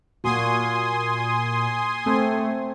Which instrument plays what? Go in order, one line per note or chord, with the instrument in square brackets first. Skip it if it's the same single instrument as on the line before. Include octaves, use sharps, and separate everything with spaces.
[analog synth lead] A#2 [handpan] A#3 F#4 [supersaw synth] G#5 C6 D#6
[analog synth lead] A3 [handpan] C4